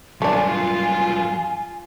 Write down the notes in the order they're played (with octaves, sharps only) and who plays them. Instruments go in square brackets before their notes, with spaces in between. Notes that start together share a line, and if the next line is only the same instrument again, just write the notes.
[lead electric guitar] G2 F#3 [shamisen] A3 D4 [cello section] F4 [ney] G#5